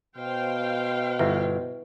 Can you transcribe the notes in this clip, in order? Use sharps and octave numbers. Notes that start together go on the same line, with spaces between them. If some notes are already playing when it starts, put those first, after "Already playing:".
B2 C5 F5 G5
G1 E4 B4 E5